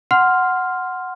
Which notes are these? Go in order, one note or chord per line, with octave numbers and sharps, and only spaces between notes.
F#5 C6 F6